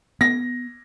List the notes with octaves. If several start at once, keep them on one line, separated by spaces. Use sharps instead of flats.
B3 A#6